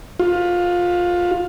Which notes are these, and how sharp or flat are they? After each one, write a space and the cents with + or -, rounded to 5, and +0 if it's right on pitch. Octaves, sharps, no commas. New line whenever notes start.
F4 +15